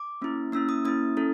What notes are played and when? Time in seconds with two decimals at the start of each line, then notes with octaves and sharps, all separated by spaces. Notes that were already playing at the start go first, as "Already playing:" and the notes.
Already playing: D6
0.22 A#3 C#4 E4
0.52 A#3 C#4 E4 E6
0.69 D#6
0.85 A#3 C#4 E4 D#6
1.17 C#4 E4 A4